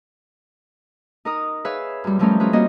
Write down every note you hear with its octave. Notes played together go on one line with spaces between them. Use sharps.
D#4 A#4 D#6
G#4 B4 C#5 E5 F5 E6
F#2 G3
F3 G3 A3 C#4 D#4 A#4
G3 C#4 F4 G#4 B4
G3 A#3 C4 C#4 F#4 D#5